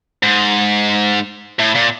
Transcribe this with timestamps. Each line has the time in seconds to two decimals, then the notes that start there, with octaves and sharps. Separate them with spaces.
0.23 G#2
1.59 A2
1.75 A#2